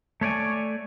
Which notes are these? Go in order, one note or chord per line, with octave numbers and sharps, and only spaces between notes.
A3 C#5 D5 G#5